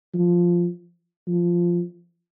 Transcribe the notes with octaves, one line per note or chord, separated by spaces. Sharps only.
F3
F3